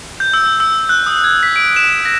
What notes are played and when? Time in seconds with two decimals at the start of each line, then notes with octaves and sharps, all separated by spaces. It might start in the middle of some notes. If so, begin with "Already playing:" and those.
0.20 G6
0.34 E6
0.60 E6
0.89 F#6
1.07 D#6
1.24 G#6
1.43 B6
1.56 D7
1.76 E7
2.05 A#6